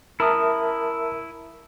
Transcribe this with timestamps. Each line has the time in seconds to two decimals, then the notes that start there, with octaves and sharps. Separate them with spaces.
0.20 E4 A#4 E5 A5 D#6